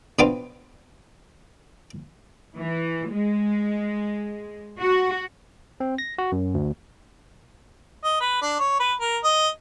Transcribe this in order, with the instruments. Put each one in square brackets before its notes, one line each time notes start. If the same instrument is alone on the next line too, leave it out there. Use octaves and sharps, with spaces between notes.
[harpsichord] B2 B3 C4 D4 F4
[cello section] E3
G#3
F#4
[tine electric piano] C4
A#6
F#4
F#2
D2
[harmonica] D#5
B4
D4
C#5
B4
A#4
D#5